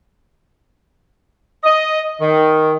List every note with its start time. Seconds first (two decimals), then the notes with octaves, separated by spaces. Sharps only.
1.64 D#5
2.21 D#3